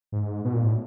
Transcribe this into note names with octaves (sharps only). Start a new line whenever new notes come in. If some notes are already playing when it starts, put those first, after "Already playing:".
G#2
B2
A#2
A2